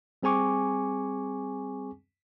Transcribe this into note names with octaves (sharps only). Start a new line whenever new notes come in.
G3 C4 G#4 G#5 C#6 D6